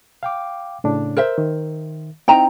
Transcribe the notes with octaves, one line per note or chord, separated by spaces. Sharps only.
F5 G5 D6
A2 C#3 D4
A#4 C5 E5
D#3
C4 D#4 E4 G5 A#5